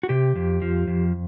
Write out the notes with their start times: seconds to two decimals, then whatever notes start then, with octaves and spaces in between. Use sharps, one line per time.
0.03 F#4
0.09 C3 G4
0.36 F2
0.62 F3
0.88 F2